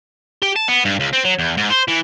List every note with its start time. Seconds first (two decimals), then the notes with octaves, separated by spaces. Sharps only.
0.43 G4
0.56 A5
0.68 B3
0.85 G2
1.00 C#2
1.13 C4
1.25 F#3
1.38 E2
1.57 G#2
1.70 C5
1.88 E3